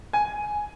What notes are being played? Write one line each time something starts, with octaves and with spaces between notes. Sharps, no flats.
G#5